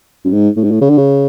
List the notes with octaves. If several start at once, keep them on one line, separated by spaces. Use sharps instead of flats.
F#2
G#2
A2
G#2
A2
C#3
D3
C#3